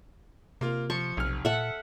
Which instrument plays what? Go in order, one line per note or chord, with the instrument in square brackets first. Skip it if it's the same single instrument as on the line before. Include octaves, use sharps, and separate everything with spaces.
[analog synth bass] C3 [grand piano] A#3 F4
[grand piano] F3 [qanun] C#6
[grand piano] F1 F6 [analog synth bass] B1
[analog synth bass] A#2 [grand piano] A4 [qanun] E5 F#5